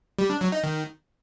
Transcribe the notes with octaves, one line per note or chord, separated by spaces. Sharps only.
G3
D4
F#3
D#4
D#3